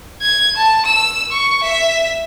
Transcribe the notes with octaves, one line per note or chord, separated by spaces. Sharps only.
G#6
A5
E6
C#6
E5